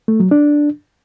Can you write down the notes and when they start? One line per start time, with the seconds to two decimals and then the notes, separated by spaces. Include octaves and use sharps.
0.08 A3
0.20 F#3
0.31 D4